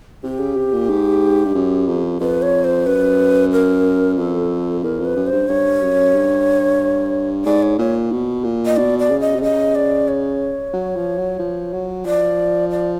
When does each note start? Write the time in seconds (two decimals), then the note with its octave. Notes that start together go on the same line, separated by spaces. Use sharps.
0.23 C3 G4
0.40 C#3
0.56 C3
0.73 A#2
0.90 G#2
1.45 G2
1.55 F#2
1.88 F2
2.20 F2 B4
2.42 C#5
2.64 C5
2.86 F#2 B4
3.52 A#4
4.17 F2 A4
4.83 E2 A#4
4.99 F2
5.05 B4
5.16 F#2
5.27 C5
5.32 G2
5.49 G2 C#5
5.81 F#2
6.14 G2
7.45 G#2 D5
7.62 C#5
7.78 A#2 C#5
8.12 B2
8.44 A#2
8.66 D#5
8.77 B2 D5
8.99 D5
9.10 C#3
9.21 D#5
9.36 C3
9.42 C#3 D#5
9.75 D5
10.08 C#5
10.74 F#3
10.96 F3
11.18 F#3
11.39 F3
11.73 F#3
12.05 F3 D5
12.71 D5